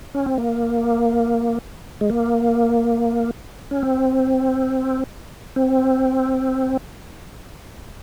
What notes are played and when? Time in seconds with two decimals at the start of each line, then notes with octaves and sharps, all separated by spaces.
0.14 C#4
0.26 C4
0.38 A#3
2.01 G#3
2.10 A#3
3.71 C#4
3.83 C4
5.56 C4